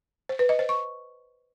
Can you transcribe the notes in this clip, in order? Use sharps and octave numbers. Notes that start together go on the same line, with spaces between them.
C5
B4
D#5
C5
C#6